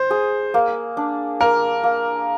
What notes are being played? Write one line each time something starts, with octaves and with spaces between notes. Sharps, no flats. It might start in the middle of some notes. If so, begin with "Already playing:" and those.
Already playing: C5
G#4
A#3
D4
A#3 A#4
A#3